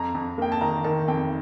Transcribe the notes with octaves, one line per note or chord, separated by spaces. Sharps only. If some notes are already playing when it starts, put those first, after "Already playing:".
Already playing: F2 A#5
F2
A#3 G5
A5
D#3 A#5
D#3 A5
F2 G5